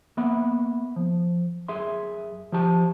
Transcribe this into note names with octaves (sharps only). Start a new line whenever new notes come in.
A#3 B3 E5 B5
F3
F#2 G#4 E5 C6
F3 G4 A5